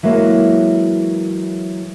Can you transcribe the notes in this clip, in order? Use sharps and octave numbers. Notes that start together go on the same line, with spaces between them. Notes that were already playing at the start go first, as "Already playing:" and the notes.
E3 F#3 G#3 A#3